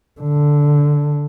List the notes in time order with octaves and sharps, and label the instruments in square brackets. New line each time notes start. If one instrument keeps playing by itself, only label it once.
[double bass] D3